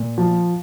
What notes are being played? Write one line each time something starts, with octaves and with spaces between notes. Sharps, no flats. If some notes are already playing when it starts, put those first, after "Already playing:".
Already playing: A#2
F3